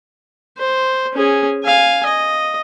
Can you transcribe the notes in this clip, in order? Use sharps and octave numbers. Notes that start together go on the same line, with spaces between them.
C5
C#4 G#4
F5 G#5
D#5